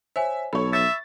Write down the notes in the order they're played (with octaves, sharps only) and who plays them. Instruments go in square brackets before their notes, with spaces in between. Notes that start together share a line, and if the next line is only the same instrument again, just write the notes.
[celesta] C5 C#5 G#5 [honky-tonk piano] E5
[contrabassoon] B1 [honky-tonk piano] A4 C#5 [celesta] B5 C#6
[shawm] E5 [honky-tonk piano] A6